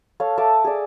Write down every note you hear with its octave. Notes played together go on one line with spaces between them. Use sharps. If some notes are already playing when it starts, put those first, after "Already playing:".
A4 C#5 F5
A4 E5 A5 D6
G#4 D5